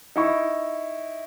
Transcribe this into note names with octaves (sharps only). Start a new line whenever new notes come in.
D#4 E4 C#6